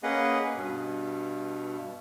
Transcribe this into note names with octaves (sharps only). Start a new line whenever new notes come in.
A#3 C#4 G#4 B4 D#5 F#5
G2 B2